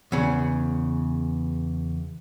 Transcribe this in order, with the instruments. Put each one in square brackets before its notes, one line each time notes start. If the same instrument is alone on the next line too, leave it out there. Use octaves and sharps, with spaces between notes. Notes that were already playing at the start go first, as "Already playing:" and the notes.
[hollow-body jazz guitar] E2 C#3